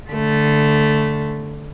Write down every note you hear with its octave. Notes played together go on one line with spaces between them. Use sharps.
D3 A3